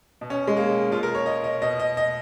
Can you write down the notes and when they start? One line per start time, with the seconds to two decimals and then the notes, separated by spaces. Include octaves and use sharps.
0.21 B2
0.30 C#4
0.48 G#3
0.57 A#3
0.91 B2 F4
1.03 A#4
1.15 C#5
1.26 D#5
1.44 D#5
1.62 B2 D#5
1.79 D#5
1.97 D#5